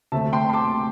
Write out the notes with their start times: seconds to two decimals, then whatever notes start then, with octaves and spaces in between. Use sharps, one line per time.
0.12 D2 C3 A3 C4 E5 A5
0.33 G5 C6
0.50 C6
0.53 A5 D6